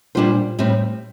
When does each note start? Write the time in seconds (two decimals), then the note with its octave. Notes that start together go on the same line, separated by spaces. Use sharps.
0.15 A#2 G3 D4 F4 C5
0.59 A2 G3 C4